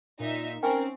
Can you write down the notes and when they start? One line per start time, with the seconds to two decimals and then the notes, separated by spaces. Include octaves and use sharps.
0.20 A#2 D#4 E5
0.63 C4 C#4 A#4 G5 G#5 C#6